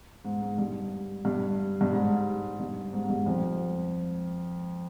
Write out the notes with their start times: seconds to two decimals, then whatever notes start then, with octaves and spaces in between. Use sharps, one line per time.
0.25 G#2
0.42 G#2
0.58 G2
1.25 G2
1.81 G2
1.93 G#2
2.60 G2
2.93 G#2
3.04 G#2
3.09 G2
3.26 F2